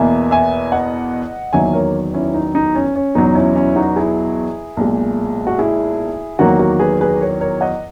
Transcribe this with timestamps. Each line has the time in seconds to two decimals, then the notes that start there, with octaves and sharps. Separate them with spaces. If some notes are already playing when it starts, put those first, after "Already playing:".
Already playing: E2 B2 A#3 E5 G#5
0.31 E5 G#5
0.72 D#5 F#5
1.53 E2 D#3 F#3 A#3 E5 G#5
1.73 A#4 C#5
2.13 C#4 E4
2.34 D#4
2.55 D#4
2.75 C#4
2.96 C#4
3.15 E2 B2 F#3 D#4
3.35 C#4 E4
3.56 C#4 E4
3.76 D#4 F#4
3.96 E4 G#4
4.77 B1 A#2 G#3
5.47 F#4
5.58 E4 G#4
6.39 E2 D#3 F#3 A#3 F#4 A#4
6.59 F#4 A#4
6.79 G#4 B4
7.01 G#4 B4
7.20 A#4 C#5
7.40 A#4 C#5
7.61 D#5 F#5